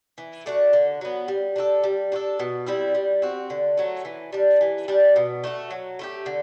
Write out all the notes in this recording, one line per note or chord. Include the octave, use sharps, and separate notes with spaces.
E3
A3 D4 F#4
D3
F#3 B3
G3
D4 F#4 A4
G3
D4 F#4 A4
B2
G3 C4 E4
G3
C4 F#4
D3
F#3 A3
E3
G3 D4
E3
G3 D4
B2
A3 D4 F#4
F#3
A3 E4 G4
D3